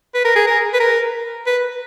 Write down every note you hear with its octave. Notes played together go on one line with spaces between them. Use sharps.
B4
A#4
G#4
A#4
B4
A#4
B4